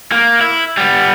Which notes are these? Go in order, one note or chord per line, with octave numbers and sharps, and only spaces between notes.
A#3
E4
G3 B3